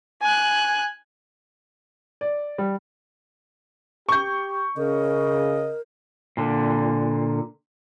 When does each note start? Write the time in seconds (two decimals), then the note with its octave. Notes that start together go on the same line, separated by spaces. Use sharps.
0.22 G#5 F#6
2.21 D5
2.58 G3
4.09 G4 C#6 G6
4.77 C#3 A#4 D#5
6.37 A#2 D3